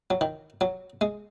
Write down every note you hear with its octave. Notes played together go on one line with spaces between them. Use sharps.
F#3
D#3
F#3
G#3